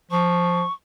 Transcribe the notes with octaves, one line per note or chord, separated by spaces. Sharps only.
F3 C#6